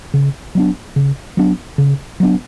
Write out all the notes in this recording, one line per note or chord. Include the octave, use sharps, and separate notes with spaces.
C#3
F#3 B3 D4
C#3
F#3 B3 D4
C#3
F#3 B3 D4